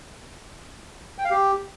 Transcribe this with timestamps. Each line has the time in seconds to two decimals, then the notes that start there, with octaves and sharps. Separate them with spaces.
1.18 G5
1.25 F5
1.31 G4